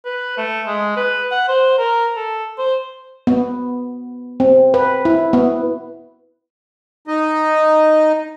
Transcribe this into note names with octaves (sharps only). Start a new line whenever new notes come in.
B4
A3
G#3
B4
F#5
C5
A#4
A4
C5
B3
C4
B4
E4
B3
D#4 D#5